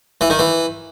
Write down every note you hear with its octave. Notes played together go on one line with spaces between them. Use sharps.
E3
D#3
E3